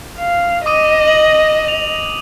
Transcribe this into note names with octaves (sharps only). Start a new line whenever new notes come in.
F5
D#5 D6 D#6 D#7
F#7
F7